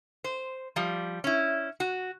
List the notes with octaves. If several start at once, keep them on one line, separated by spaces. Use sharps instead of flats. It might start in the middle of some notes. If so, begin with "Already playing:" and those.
C5
F3 G3
C#4 E4
F#4